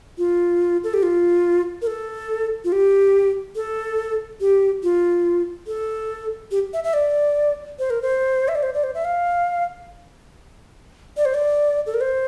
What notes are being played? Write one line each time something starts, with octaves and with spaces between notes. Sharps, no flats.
F4
A4
G4
F4
A#4
A4
F4
G4
A4
G4
F4
A4
G4
E5
E5
D5
C5
A#4
C5
E5
D5
C5
D5
C5
E5
F5
D5
C5
D5
A4
A#4
C5